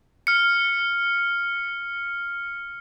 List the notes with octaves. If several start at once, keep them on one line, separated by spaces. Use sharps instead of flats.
F6 C#7